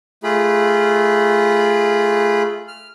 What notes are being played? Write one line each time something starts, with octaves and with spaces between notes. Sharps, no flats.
A3 F4 G#4 B5
F6